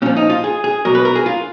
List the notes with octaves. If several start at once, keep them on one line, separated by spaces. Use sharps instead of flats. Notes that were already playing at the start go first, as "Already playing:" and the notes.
A#2 F3 C#4
D#4
F4
G#4
G#4
B2 F#3 A#4
B4
A#4
G#4
F4